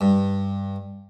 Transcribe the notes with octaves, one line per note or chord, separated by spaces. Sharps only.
G2